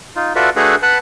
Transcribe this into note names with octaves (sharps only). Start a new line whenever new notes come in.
D#4 F4
F4 F#4 A4 B4 D5 E5
A3 D4 F#4 G#4 A4 B4
B4 F#5 A5 B5